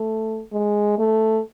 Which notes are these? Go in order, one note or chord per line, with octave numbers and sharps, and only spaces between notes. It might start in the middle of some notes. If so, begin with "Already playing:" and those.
Already playing: A3
G#3
A3